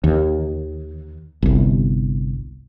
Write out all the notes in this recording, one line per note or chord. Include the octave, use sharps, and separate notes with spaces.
D#2
G1 C2